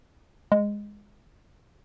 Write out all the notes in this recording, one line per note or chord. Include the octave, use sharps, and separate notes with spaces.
G#3